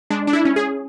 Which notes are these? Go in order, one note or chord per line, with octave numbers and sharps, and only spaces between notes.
G#3 D4
D4
E4
C#4
G#4